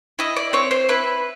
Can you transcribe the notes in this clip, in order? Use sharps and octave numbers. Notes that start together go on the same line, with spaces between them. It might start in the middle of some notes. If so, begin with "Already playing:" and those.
E4 D#5
D5
C4 C#5
C5
E4 B4